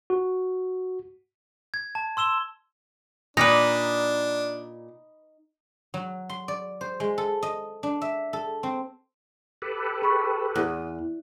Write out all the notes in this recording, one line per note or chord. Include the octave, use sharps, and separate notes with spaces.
F#4
G#6
A5
C6 E6 E7 G7
A#2 D4 D#4 B4 D5
F#3
C6
D5
C5
G#3
A4
D#5
D4
E5
A4
C4
G4 A4 B4
G#4 B5 C#6
E2 F#6